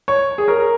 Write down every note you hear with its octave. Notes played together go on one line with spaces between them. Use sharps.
C#5
G#4
A#4